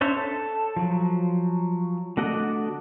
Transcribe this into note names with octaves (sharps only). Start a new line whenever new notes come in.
C#4 D4 C5 C#5 E5
A4
F3 F#3
D3 A3 F#4 D5 D#5